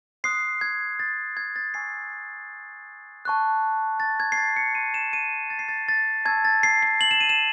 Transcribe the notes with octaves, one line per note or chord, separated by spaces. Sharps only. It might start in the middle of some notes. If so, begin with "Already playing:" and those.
C6 D#6 F#6 C7
G#6
A6
G#6
A6
G#5 C#6 E6 C7
A5 C#6 F#6
A6
G#6
C7
A6
C#7
C6 F#6 D#7
E7
D#7
A6
C7
A6
A6
A5 C#6 E6 G#6
A6
C7
C7
F#7
E7
D#7
E7